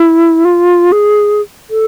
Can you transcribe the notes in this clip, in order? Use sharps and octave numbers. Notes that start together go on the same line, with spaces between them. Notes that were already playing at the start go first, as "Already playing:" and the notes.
Already playing: E4
F4
G#4
A4